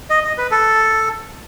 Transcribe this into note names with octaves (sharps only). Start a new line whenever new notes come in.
D#5
D#5
B4
A4